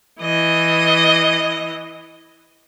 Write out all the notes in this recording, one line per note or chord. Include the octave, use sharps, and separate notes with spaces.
E3 D#5